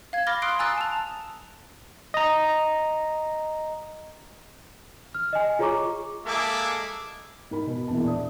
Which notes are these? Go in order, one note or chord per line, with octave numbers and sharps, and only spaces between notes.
F5 G#6
B5 D6 F6 A6 A#6 G7
C6 D#6 F6 F#6 C7 D7
G#5 A#5 D#6 E6 F#6 A6
A5 F7
D#5 A#5
F6
D#5 G#5
F4 G#4 C#5 A#5 C#6 D6
G#3 A#3 G#4 A4 E5 D6
G#2 A#4 B5
B2
E1 A#1 E2 E4 A5
D5 E5 D#6